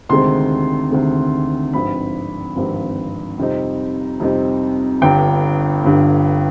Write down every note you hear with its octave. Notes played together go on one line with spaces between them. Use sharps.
D2 C3 D#3 G#3 C4 C6
D2 C3 D#3 G#3 C4
G#1 G2 F3 C4 B5
G#1 G2 F3 C4
F2 C3 G3 C4 D#4
F2 C3 G3 C4 D#4
G1 G2 D3 G5
G1 G2 D3